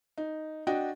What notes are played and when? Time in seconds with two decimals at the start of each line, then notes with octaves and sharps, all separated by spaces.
0.18 D#4
0.67 D4 F#4 D#5 G5